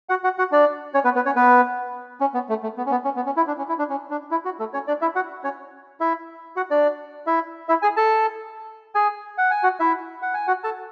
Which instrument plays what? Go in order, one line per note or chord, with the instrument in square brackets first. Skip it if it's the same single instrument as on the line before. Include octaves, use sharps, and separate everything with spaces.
[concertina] F#4 F#5
F#4 F#5
F#4 F#5
D4 D5
C#4 C#5
B3 B4
B3 B4
C#4 C#5
B3 B4
C#4
B3
A3
A3
B3
C#4
B3
C#4
B3
C#4
E4
D4
C#4
E4
D4
C#4
D4
E4
F#4
A3 A4
C#4 C#5
D4 D5
E4 E5
F#4 F#5
C#4 C#5
E4 E5
F#4 F#5
D4 D5
E4 E5
E4 E5
G#4 G#5
A4 A5
G#4 G#5
F#5
G#5
F#4 F#5
E4 E5
F#5
G#5
F#4 F#5
A4 A5